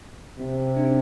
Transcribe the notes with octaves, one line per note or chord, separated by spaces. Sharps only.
C3 C4
D4
D#4